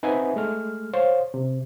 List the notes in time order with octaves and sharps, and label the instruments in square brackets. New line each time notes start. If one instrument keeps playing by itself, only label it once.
[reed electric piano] C4 D#4 B4 E5 F#5 G#5
G#3 A3 F6
C5 C#5 F5
C3